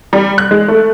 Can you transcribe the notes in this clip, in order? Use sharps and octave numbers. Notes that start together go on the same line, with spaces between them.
G3
F#6
G#3
A3